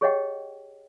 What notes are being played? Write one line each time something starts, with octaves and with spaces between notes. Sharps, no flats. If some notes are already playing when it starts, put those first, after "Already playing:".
G4 G#4 C#5 D#5 F#5 G5